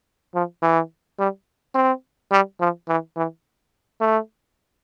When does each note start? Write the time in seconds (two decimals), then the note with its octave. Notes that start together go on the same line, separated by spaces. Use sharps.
0.35 F3
0.62 E3
1.19 G3
1.75 C4
2.32 G3
2.60 F3
2.88 E3
3.17 E3
4.01 A3